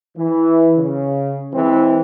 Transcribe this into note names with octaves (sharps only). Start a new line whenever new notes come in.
E3
C#3
E3 G#3 C4